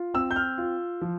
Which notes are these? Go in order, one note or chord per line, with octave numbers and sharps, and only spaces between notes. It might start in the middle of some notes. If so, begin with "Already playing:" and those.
Already playing: F4
C4 E6
G6
F6
F4
F3